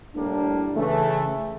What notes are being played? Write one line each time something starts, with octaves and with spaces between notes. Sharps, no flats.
A2 G3 A#3 D4
C#3 E3 A3